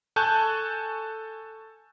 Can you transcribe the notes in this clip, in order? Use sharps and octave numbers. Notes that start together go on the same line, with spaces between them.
A4 G#5 A5 C#6 F#6 G6